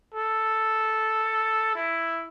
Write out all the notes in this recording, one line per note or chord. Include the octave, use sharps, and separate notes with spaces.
A4
E4